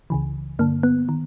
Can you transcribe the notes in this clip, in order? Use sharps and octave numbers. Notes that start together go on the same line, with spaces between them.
C#2 C#3 E3
G2 D3 A#3
B3
D#3